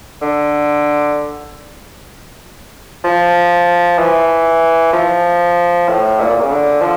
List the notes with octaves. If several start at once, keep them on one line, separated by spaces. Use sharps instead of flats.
D3
F3
E3
F3
A2
A#2
A#2
C#3
D3
F3